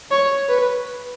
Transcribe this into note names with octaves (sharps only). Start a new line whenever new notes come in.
C#5
B4